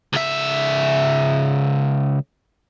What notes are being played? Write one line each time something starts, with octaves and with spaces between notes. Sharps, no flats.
C#2 E5